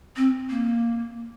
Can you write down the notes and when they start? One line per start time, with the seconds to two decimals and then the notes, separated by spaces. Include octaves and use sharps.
0.16 C4
0.50 A#3